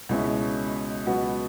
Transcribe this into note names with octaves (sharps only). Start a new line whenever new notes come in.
C#2 B2 G#3 C#4 E4
C#2 B2 F#3 B3 F#4